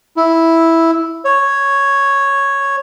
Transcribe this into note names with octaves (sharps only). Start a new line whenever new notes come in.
E4
C#5